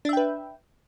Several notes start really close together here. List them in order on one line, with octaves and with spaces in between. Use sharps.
D4 E5 G5 B4